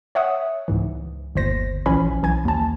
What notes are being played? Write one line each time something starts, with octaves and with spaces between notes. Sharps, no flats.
C#5 E5 F#5 D#6
C#2 G#2 E3
G1 D#2 C5 A#6
A#1 E3 F3 C#4 G#5 B5
B1 E3 G#5 G#6
D#2 A5